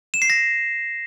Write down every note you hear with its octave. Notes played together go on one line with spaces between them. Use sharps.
E7
C7
A#6